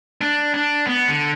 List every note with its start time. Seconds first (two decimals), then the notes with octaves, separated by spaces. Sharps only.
0.21 D4
0.54 D4
0.87 B3
1.08 D3